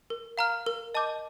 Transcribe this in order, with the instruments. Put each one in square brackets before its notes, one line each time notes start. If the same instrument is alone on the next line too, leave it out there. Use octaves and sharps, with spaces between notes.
[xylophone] A#4
F5 A#5 F6
A#4
D#5 A5 D6 G6